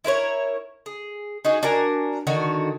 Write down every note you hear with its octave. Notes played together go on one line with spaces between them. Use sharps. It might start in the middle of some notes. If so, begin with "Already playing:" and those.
E4 A#4 B4 C#5
G#4
D#4 F#4 G#4
D4 F#4 A#4 G#5
D3 D#3 F#4